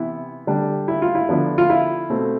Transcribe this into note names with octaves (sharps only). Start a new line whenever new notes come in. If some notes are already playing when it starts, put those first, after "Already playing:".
Already playing: C3 E3 B3 E4
D3 G3 D4
E4
F4
E4
D3 F3 B3 D4
F4
E4
B2 A3 C4